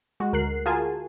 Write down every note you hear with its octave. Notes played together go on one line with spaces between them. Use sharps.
G#3 F#4
D2 A#4 F#6 C7
F4 F#4 G#4 A#4 G#5 A5